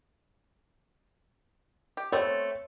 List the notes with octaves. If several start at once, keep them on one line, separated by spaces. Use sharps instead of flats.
G4
A3 B3 C4 C#5